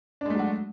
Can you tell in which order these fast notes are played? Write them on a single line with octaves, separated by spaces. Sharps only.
D4 G#3 A3 F#3 F#4